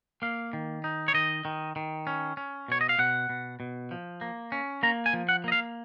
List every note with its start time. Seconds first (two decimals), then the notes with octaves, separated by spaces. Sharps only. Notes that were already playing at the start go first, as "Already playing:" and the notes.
0.22 A#3 F5
0.53 D#3
0.84 D#4
1.08 C#5
1.14 D#3 D#5
1.45 D#3
1.76 D#3
2.07 C#4
2.37 C#4
2.68 B2 C#5
2.81 D#5
2.89 F5
2.99 B2 F#5
3.29 B2
3.60 B2
3.91 F3
4.21 A#3
4.52 C#4
4.83 A#3 A#5
5.06 G#5
5.13 F3
5.29 F#5
5.44 A#3 D#5
5.52 F5